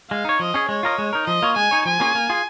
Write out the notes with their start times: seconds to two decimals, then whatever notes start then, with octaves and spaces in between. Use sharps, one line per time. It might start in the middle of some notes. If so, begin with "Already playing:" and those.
0.10 G#3 F5
0.25 D#4 C#5
0.40 F3 D#5
0.54 C#4 G#4
0.69 G#3 C#5
0.83 F4 A#4 D#5
0.98 G#3
1.13 D#4 A#4
1.27 F3 D#5
1.42 A#3 F4 C#5
1.56 G#3 G#5
1.71 D#4 C#5
1.85 F3 G#5
2.00 A#3 C#4 F4 G#4
2.15 A#3
2.30 F4 G#4